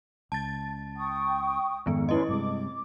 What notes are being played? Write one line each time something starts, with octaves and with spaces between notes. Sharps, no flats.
C#2 A5 A6
G5 C#6 D#6
F2 G#2 D#3 B3
C#4 E4 B4 D#5 C6
G2 C3 G#3 D6